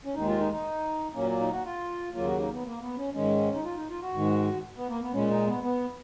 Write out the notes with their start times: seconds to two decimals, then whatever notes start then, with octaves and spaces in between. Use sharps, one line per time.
0.05 C#4
0.15 D#2 D#3 G#3 D#4
0.28 F4
0.40 D#4
0.52 D#4
1.14 A#2 F#3 A#3 C#4
1.40 D#4
1.52 F#4
1.65 F4
2.14 D#2 C#3 F#3 A#3 F4
2.27 F#4
2.39 D#4
2.52 B3
2.65 A#3
2.81 B3
2.97 C#4
3.14 G#2 D#3 G#3 C#4
3.54 D#4
3.64 F4
3.76 D#4
3.89 F4
4.02 F#4
4.14 G#2 D#3 G#3
4.76 B3
4.89 A#3
5.01 B3
5.13 A#2 G#3 C#4
5.30 D#4
5.47 B3
5.63 B3